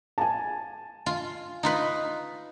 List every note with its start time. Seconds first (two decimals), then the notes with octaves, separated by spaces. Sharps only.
0.18 G#5 A5
1.06 F4
1.63 D#4 F4 B4